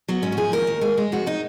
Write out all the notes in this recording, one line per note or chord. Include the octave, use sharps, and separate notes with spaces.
F#3 B3
G#2 C#4
F#4
F3 G#4
D#2 A#4
D#2
G#3 G#4
G#3
F2 F#4
G#3 D#4